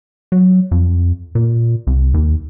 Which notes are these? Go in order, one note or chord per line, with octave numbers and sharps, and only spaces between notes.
F#3
F2
A#2
C2
D#2